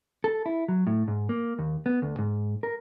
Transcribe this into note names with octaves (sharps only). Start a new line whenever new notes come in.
A4
E4
F#3
A2
G#2
A#3
D#2
B3
D2
G#2
A#4